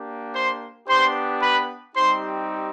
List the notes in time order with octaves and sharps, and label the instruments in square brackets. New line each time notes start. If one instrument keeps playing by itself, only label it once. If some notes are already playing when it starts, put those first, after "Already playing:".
Already playing: [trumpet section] A#3 D4 G4
C5 C6
B3 D4 G4 C5 C6
B4 B5
G3 C4 D#4 G4 C5 C6